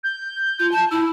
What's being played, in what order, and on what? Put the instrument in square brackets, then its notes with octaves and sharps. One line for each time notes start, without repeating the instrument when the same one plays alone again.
[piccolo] G6
[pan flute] F4
A5
[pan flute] E4 [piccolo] E6